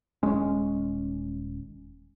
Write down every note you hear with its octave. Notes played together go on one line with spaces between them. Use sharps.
D#1 G#3 C#4